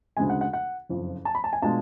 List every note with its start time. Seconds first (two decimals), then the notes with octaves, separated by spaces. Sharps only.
0.17 D2 C#3 G#3 G#5
0.30 F#5
0.41 F#5
0.53 F#5
0.89 F#1 F2 F3
1.25 A5
1.35 B5
1.44 A5
1.53 G#5
1.62 B2 G#3 D4 F4 A5